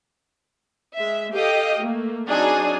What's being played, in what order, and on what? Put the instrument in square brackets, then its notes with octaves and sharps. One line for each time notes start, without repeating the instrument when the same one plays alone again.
[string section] G#3 E5
G4 A4 D#5 F5 G5
A3 A#3
F#3 C4 D4 D#4 G#4